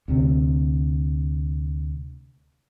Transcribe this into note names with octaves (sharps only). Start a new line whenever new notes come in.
D2 C3